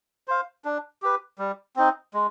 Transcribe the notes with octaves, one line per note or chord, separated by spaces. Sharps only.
C5 F5
D4
G4 B4
G3
C4 D#4
G#3